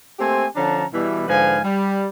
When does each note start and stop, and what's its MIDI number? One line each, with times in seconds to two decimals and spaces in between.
0.19 0.46 57
0.19 0.46 58
0.19 0.46 60
0.19 0.46 67
0.19 0.46 72
0.19 0.46 80
0.55 0.85 50
0.55 0.85 53
0.55 0.85 61
0.55 0.85 62
0.55 0.85 81
0.55 0.85 82
0.93 1.25 47
0.93 1.25 52
0.93 1.25 55
1.28 1.58 44
1.28 1.58 50
1.28 1.58 53
1.28 1.58 71
1.28 1.58 77
1.28 1.58 80
1.64 2.07 55